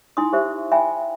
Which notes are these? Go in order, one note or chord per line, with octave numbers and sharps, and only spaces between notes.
D#4 E4 G#5 C6 D#6
G4 C5 E5
E5 G5 G#5 B5